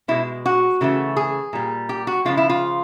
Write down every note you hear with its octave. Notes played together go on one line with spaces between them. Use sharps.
B2 G#3 E4
F#4
C#3 E3 A3
G#4
A#2 G3
G4
F#4
C#3 F3 G#3 F4
E4
F4